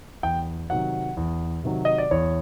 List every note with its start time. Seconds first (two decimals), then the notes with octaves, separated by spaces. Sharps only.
0.23 E2 G5
0.70 C3 D#3 F#3 F#5
1.17 E2
1.64 C3 D#3 F#3
1.85 D#5
1.98 D5
2.11 E2 C#5